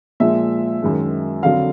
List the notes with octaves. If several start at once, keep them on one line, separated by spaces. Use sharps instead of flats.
A#2 F3 G#3 E5
F#2 D#3 G#3
F2 D3 F#3 F5